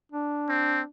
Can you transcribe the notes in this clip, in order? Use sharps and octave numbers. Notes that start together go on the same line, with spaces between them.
D4
C4